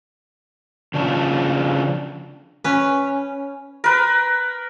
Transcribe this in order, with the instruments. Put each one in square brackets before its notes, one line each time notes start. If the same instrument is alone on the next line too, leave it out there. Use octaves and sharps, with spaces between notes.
[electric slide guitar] C#3 F3 D4
[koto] C#4 B4
[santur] A#4 B4